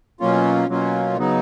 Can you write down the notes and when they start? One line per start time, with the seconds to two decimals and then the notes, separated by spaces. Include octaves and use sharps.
0.20 B2 F#3 A#3 C#4 F4
0.69 B2 F#3 A#3 C#4 F4
1.17 C#3 F#3 B3 D#4